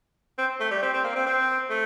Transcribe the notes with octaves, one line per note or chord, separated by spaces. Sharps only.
C4
A3
G3
C4
C4
A#3
C4
C4
A3